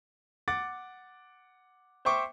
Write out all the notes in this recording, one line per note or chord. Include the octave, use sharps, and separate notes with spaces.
F#5 D6 A6
C5 E5 G5 C#6 D6